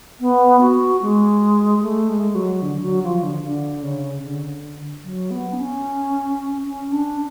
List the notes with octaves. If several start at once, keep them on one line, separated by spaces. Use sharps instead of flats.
B3
F#4
G#3
A3
G#3
F#3
D3
F#3
F3
D3
D3
C#3
D3
F#3
B3
D4
C#4
C#4
D4